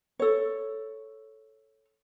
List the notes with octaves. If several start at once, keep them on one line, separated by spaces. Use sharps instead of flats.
A4 C#5